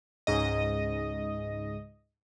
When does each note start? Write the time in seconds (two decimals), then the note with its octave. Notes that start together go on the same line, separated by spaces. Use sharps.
0.27 C#2 G#2 D#5